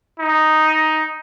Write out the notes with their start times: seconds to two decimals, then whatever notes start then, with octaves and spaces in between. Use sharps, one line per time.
0.19 D#4